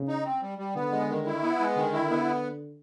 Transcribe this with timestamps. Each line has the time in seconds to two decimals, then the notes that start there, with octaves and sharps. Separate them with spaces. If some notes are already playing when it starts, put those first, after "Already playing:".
Already playing: C#3
0.08 D#4
0.25 C4
0.42 G3
0.58 G3
0.75 D3 B3
0.92 G#3
1.09 D#3
1.26 E4
1.43 B3
1.60 G#3
1.77 D3 D#3
1.93 E4
2.10 B3